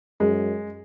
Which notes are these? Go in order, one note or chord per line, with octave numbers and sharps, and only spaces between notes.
F#2 G#3